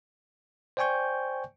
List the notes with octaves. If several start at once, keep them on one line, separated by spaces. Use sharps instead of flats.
C5 D5 G5 G#5 C#6 G6